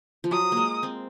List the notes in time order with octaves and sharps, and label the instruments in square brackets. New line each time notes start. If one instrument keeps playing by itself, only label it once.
[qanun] F3
[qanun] F#3 [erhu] D#6
[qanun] G#3 A#3
C4